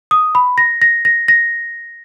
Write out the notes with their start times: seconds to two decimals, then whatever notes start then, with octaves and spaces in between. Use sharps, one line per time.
0.11 D#6
0.35 B5
0.58 A#6
0.82 A#6
1.05 A#6
1.28 A#6